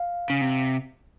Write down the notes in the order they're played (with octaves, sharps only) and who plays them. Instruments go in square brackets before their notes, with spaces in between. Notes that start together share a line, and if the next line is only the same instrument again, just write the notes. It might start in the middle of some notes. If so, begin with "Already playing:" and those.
Already playing: [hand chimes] F5
[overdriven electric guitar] C#3
C3